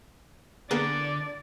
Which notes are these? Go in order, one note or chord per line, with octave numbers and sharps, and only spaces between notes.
D3 A#3 B3 G#4 D5